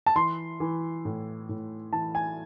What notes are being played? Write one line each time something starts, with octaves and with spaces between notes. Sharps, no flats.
A5
E3 C6
E3
A2
A2
E3 A5
G#5